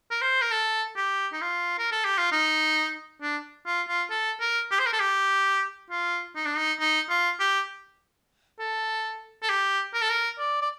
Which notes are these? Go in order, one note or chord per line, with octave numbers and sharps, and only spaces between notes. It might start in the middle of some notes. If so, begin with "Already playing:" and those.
A#4
C5
A#4
A4
G4
D#4
F4
A#4
A4
G4
F4
D#4
D4
F4
F4
A4
A#4
G4
C5
A#4
A4
G4
F4
D#4
D4
D#4
D#4
F4
G4
A4
A4
G4
A#4
A4
A#4
D5
D5